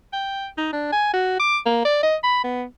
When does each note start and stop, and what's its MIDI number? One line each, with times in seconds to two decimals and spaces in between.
0.13 0.48 79
0.57 0.69 63
0.73 0.87 62
0.92 1.10 80
1.13 1.37 66
1.39 1.58 86
1.66 1.84 58
1.85 2.01 74
2.03 2.16 75
2.23 2.40 83
2.44 2.64 59